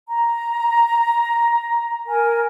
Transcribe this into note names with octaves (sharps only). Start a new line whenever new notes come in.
A#5
A#4 G#5